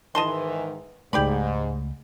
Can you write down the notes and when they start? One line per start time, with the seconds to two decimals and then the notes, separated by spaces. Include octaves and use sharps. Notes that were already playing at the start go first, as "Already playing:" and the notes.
0.15 G#2 D#3 E3 D#5 A5 C6
1.13 C#2 G#2 A3 G4 D5 B5